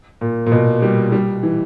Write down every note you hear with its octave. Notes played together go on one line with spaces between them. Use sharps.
A#2
A#2
B2
G3
G3
E3